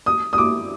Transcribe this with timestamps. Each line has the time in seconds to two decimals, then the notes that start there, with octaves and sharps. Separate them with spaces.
0.06 D#6
0.33 D#6
0.38 D6